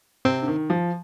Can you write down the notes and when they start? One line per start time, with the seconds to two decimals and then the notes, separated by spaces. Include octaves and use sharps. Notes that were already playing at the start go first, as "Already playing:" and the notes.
0.25 C3 C4
0.42 D3
0.48 D#3
0.70 F3